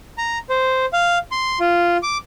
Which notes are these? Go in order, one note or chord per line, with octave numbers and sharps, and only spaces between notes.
A#5
C5
F5
C6
F4
D6